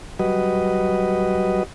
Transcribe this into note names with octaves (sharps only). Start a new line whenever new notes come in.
F#3 G3 F#4 B4 D#5